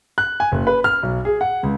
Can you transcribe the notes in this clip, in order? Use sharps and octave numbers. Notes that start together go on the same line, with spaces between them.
F#6
G#5
F#1
B4
F6
B1
G#4
F#5
C#2